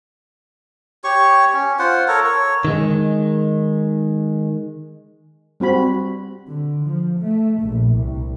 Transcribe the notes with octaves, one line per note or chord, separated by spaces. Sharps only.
G4 C#5 C#6
C#4
F4 C5 F#5
A4 A#4 C#5
C#5
D#3 G#3
G3 C4 F#4 B5
D3
F3
A3
A#1
C2